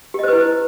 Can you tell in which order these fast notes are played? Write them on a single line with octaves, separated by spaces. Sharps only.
G4 D#5 C5 B4 E4